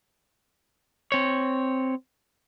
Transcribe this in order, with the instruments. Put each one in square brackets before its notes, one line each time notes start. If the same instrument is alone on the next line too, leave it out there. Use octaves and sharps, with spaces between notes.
[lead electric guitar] C4 C#5